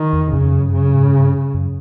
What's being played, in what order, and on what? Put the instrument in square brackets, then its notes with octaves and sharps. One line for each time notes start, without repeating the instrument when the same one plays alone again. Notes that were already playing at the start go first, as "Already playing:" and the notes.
Already playing: [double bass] D#3
[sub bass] E2
[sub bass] F2 [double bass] C#3
[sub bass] F#2
G2
[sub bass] F#2 [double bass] C#3
[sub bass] G#2
G2
F#2